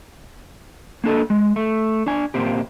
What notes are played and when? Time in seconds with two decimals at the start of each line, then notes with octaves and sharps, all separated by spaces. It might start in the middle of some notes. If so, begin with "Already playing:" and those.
1.04 A#3 D4 A4 D#5
1.30 G#3
1.56 A3
2.06 D4 G#5
2.34 A#2 A#3 C4 G4